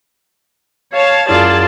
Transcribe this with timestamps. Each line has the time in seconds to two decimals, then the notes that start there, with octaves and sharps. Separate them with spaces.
0.94 C#5 F5 A5
1.28 F#2 E4 F4 G#4 D5 A5 G#6